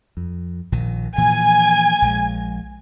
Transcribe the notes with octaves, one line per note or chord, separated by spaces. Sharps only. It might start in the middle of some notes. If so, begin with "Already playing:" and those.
F2
A#1 A#2 D#3
A#2 E3 F3 G#5
A#1 G#3